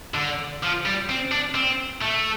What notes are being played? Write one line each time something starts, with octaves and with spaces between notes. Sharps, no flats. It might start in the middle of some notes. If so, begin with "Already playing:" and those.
D3
F3
G3
C4
D4
C4
A3